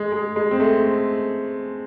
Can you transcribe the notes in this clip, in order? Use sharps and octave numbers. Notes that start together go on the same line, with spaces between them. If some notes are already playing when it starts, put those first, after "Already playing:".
Already playing: G#3
G#3
G#3
C4
A3